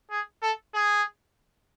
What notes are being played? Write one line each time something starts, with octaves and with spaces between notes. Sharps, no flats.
G#4
A4
G#4